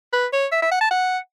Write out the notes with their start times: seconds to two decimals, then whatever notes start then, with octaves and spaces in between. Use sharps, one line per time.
0.13 B4
0.33 C#5
0.52 E5
0.62 E5
0.71 F#5
0.81 A5
0.91 F#5